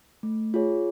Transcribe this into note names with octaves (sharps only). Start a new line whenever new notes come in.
A3
F4 G#4 C#5